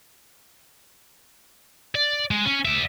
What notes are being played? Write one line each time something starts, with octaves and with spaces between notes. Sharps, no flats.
D5
G#3
C#4
D5 E5